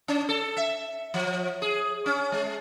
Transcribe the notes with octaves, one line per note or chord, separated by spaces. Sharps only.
C#4
A4
E5
F3
G#4
C#4
G#3